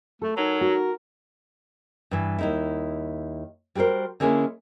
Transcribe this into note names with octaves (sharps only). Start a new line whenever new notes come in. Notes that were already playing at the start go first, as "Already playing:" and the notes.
A3 A4
F#3 D#4 A#4 A#5
F#4
G2 E3
D#2 D#4 E4
G3 F#4 G#4 A#4 C5
D3 G#3 A#3 C#4 D4 E4